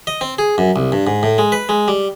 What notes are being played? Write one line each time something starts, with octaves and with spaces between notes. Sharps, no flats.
D#5
C4
G#4
F#2
C2
G2
G#2
A2
G#3
B4
G#3
G3